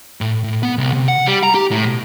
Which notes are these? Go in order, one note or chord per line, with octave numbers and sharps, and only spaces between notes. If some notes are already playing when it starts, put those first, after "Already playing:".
A2
A2
B3
C2
C3
F#5
G3
A#5
G4
A2
B2